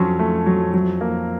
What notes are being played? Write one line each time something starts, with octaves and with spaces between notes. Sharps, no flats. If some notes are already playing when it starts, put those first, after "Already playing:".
Already playing: F2 F#3 C#4
A3
F#3
F#3
A#3